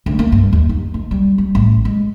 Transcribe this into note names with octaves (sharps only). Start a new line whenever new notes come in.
D2
A#3
G2
D#2
D#4
D#2
G3
G3
A1
G#3